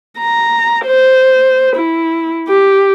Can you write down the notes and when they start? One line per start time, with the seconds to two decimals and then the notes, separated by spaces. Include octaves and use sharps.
0.19 A#5
0.85 C5
1.76 E4
2.48 G4